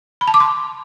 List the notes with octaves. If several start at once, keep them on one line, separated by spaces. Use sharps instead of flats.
B5
A5
D6
C6